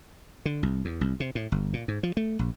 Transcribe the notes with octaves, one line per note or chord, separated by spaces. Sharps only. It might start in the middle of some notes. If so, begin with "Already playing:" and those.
D3
C2
E2
C2
C3
A2
G1
A#2
G#2
F3
A3
A#1